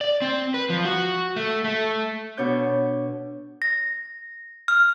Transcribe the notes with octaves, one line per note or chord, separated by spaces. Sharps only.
D5
C4
B4
F3
F#4
A3
A3
B2 D4 C#5 G6
A#6
F6